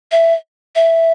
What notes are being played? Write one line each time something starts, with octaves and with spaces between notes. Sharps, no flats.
E5
E5